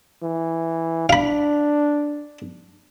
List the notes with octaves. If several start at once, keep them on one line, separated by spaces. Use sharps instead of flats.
E3
D4 F5 B5